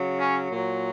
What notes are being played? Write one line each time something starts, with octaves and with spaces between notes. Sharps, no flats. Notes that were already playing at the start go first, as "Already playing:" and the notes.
Already playing: C#3 F#3
C#4
A#2 F#3